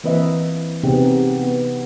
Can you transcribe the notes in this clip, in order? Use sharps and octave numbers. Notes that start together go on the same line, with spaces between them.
E3 A#3 C4 B4 D#5 E5
C3 B3 D#4 G4 G#4
B3